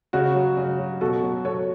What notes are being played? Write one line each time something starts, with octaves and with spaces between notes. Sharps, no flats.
C#3 F#4
F#3
C#3
F#3
B2 F#4 A4
F#3
B2 A4 C#5